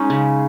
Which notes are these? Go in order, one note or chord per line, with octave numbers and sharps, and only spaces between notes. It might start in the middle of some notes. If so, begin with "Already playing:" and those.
Already playing: G#3 C#4 D#4
C#3